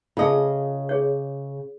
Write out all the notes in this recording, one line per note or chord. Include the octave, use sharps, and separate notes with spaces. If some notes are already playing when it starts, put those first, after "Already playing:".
C#3 F4 G#4 D#5 A5
G#4 C#5